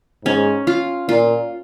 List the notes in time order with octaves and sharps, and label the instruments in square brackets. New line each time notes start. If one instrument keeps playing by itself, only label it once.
[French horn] G#2 [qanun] C#4
[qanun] F4
[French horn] A#2 [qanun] F4